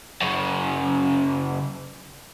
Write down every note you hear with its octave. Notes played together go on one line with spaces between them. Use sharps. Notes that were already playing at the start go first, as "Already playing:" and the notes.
F#2 C#3